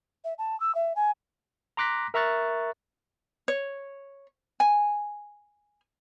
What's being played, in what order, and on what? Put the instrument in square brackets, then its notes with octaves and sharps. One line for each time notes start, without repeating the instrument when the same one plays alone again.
[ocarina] E5
A5
E6
E5
G#5
[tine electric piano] A#5 C6 D6 F#6 A#6 B6
A#4 E5 A#5 C#6 F#6 A6
[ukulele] C#5
G#5